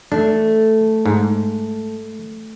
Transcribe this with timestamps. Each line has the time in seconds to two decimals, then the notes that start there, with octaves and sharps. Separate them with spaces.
0.12 A3 D4
1.06 G#2